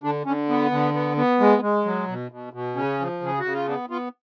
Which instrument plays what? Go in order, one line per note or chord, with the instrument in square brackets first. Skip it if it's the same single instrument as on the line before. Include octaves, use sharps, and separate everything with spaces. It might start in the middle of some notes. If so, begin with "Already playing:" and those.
[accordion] D3 D4
D3 C#4
B3
D3
B3
B3
G#3
G#3
F#3
B2
B2
B2
C#3 C#4
F3
C#3 G#4
F#4
C#3
F4
B3 D4
B3 F4